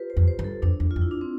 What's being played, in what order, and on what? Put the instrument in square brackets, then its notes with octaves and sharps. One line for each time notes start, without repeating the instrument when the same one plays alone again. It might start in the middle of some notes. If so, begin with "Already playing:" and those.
Already playing: [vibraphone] F4 G4 B4
C5
[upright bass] F2
[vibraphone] C5
[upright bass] G2
[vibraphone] A4
[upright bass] F2 [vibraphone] D4
[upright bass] E2
[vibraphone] F4
[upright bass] F2
[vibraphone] E4
D4
C4